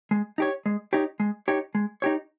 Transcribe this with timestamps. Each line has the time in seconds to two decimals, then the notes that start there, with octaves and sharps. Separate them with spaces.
0.11 G#3
0.38 D#4 G4 C#5
0.66 G#3
0.93 D#4 G4 C#5
1.20 G#3
1.48 D#4 G4 C#5
1.75 G#3
2.02 D#4 G4 C#5